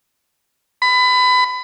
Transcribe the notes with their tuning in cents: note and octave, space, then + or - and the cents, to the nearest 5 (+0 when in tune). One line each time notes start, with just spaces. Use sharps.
B5 +25